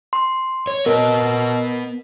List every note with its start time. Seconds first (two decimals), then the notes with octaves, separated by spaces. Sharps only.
0.13 C6
0.67 C#5
0.86 B3 A#4 B4 D#5